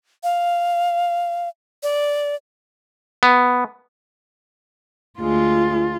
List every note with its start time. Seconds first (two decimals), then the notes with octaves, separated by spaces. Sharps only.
0.24 F5
1.83 D5
3.23 B3
5.20 D2 G#3 F4